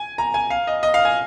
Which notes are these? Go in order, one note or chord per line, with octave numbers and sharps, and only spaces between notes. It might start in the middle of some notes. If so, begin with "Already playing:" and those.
Already playing: G#5
A#5
G#5
F5
D#5
D#5
F5
G#5